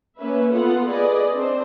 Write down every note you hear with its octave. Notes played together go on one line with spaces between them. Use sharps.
A#3 C#4 B4 E5
B3 F4 A4 F#5
G#4 B4 D5 D#5
C4 D4 C5